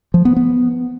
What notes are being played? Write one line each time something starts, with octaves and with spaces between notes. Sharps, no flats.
F3
B3
B3